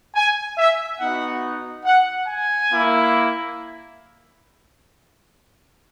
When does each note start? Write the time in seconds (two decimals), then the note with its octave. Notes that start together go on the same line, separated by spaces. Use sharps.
0.15 G#5
0.58 E5
1.00 B3 D#4 F#4 F#5
1.85 F#5
2.28 G#5
2.71 A#3 E4